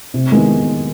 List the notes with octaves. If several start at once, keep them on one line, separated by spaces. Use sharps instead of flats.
C3
D#3 G#3 B3